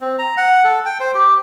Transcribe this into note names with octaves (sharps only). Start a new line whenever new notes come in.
C4
A#5
F#5
A4
G5
C5
G4